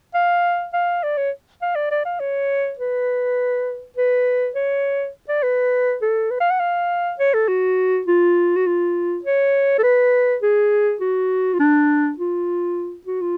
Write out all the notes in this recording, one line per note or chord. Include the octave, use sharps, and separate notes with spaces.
F5
F5
D5
C#5
F5
D5
D5
F5
C#5
B4
B4
C#5
D5
B4
A4
B4
F5
F#5
F5
C#5
A4
F#4
F4
F#4
F4
C#5
A4
B4
G#4
F#4
F4
D4
F4
F#4
F4